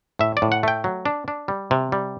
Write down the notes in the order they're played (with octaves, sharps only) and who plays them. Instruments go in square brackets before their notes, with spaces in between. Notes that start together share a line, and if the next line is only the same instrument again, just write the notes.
[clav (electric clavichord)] A2 E5
D5
A2
F#5
A3 G5
F#3
D4
D4
G3
C3
G3